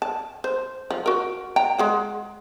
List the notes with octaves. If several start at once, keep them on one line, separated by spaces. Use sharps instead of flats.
A5
C5
F3
F#4 A#4
G5 A#5
G#3 G#4 F#5